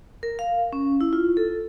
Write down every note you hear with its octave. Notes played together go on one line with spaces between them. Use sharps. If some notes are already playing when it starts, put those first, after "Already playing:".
A#4
F5
C#4
E4
F4
A4